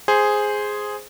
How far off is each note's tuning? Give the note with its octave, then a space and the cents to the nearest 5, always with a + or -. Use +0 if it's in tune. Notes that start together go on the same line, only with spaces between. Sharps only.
G#4 +0 C5 +0